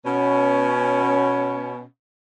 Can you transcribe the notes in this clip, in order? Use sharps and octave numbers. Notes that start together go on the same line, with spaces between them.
B2 C#4